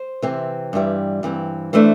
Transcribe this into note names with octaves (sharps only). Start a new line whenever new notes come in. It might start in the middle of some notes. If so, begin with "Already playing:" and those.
Already playing: C5
C3 E3 C4
G2 E3 G3
G2 E3 C4
E3 A3 D4 C5